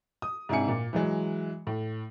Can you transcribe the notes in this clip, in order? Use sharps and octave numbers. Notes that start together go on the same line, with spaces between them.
D#6
G#2 C3 D4 E4 G#5 C#7
A#2
E3 F#3 G#3
A2